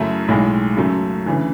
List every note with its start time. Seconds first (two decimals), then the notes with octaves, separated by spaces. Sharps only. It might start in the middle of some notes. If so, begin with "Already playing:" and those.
Already playing: F#2 C#3 F#3 A3 E4
0.28 B1 A2 G#3
0.77 F#2 C#3 F#3 A3
1.26 D2 C#3 E3